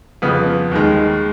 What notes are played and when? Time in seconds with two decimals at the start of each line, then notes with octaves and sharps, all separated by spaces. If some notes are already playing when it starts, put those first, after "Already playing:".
0.22 F2 C#3 F3 B3
0.71 D#2 D#3 G#3